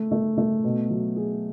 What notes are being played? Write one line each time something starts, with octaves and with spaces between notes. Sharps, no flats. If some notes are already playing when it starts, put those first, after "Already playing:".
Already playing: A3
A3
A3
B2
F#3
G#4